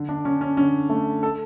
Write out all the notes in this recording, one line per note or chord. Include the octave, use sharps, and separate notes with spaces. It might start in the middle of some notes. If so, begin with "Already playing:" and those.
Already playing: D3
D4
D3 C#4
C#4
D3 C#4
A3
A4